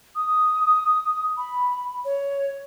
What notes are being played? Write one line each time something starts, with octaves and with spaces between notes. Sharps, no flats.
D#6
B5
C#5